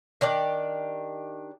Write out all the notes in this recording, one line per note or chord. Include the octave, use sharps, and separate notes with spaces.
D#3 D4 G4 D5